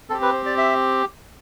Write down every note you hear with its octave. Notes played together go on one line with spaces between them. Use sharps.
C4 G4 A4
B4
C5
D5
E5